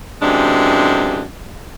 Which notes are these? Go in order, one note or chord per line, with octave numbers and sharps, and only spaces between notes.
F#2 C3 E3 G#3 D4